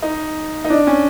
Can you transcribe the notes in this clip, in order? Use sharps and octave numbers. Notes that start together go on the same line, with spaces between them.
D#4
D#4
D4
C#4